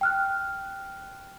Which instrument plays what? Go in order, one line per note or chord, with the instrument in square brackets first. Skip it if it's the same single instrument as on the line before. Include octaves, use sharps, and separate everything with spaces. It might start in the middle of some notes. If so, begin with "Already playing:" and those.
[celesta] G5 F6 F#6